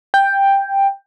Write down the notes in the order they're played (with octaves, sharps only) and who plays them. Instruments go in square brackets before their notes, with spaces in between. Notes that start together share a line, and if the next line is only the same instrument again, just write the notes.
[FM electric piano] G5